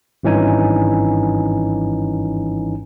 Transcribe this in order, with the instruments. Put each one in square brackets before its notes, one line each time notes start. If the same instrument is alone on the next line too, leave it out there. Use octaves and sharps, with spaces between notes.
[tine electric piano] G#1 G2 E3 C#4 D#4 G#5